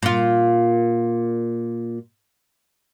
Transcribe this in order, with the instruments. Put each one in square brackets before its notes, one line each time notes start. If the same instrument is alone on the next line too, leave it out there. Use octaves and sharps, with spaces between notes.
[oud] A#2 F4